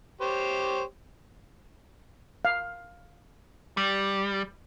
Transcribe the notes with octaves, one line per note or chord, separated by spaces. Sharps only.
G4 C5 C#5
F5
G3